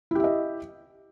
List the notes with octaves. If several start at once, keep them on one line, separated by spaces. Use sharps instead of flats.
E4 G4 D#5 E5